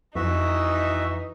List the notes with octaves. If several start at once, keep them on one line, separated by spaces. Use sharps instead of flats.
F2 E3 D#4 F#4 E5